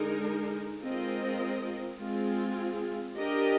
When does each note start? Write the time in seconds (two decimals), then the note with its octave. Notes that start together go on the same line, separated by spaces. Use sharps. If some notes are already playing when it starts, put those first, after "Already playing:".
Already playing: D3 G#3 D#4 A#4
0.81 G#3 C4 F4 A#4 D#5
2.00 G#3 C4 F4 G#4
3.17 D4 G4 A#4 D#5